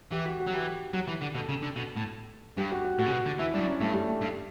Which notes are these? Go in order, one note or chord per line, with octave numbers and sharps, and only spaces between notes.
E3 G4
F#4
F#4
F#3
E3 G4
F#3
E3
D3
B2 A4
C#3
D3
B2
A2
G2 G4
F#4
F#4
A2 F#4
C#3
B2
D3
E3 E4
G2 D4
F#2
C#4
G2 A3
G3
A3
G2